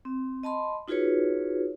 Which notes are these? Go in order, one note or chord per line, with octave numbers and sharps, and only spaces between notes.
C4
D#5 A5 B5 C6
D#4 F4 F#4 G#4 B4 C#5